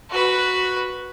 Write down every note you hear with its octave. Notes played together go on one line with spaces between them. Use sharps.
F#4 B4